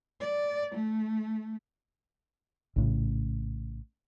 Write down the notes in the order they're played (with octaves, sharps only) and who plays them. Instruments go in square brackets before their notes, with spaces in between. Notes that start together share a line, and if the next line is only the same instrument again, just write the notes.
[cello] D5
A3
[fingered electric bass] A#1 A2 C#3